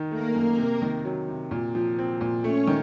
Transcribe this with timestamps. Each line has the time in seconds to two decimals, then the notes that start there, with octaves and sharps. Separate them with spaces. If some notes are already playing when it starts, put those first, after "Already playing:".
Already playing: D#3 D#4
0.11 A3 A#3 A#4
0.34 F#2
0.58 C3
0.82 D#3
1.05 F#3
1.28 C3
1.51 A#2
1.75 F3
1.99 C4
2.21 A#2
2.44 A3 C#4 C#5
2.67 D#3